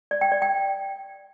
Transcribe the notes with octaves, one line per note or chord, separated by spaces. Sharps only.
D5
G5
D5
G5